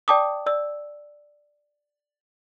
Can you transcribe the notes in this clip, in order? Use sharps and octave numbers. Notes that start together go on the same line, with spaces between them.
D5 G5 A5 D6 D#6
D5 E6